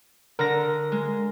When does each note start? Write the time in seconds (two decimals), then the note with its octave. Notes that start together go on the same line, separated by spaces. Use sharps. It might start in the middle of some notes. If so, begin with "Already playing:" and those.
0.39 D3 A#4 A#6
0.92 G#3